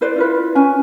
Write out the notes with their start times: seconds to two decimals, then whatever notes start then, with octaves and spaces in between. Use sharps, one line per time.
0.01 E4 B4 C5 D5
0.16 E4 F4 B4
0.55 C#4 G#5